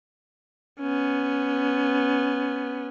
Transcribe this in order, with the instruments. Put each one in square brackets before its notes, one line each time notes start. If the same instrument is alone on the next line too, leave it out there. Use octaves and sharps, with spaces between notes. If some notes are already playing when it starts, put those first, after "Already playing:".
[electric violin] B3 C#4